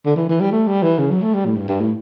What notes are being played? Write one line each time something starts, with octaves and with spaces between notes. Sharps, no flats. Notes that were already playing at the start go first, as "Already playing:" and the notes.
D3
E3
E3
G3
A3
G3
E3
C#3
F#3
A3
G3
A2
G2
G2
A2